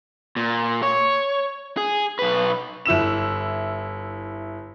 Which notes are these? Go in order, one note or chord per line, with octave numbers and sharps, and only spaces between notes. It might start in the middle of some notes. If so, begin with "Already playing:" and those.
A#2
C#5
G#4
B1 B4
G1 E4 E6 E7